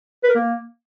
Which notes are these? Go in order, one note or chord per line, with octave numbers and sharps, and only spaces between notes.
B4
A#4
A#3